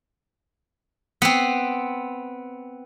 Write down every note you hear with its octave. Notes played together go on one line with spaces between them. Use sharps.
B3 C4